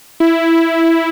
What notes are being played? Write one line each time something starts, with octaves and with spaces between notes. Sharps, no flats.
E4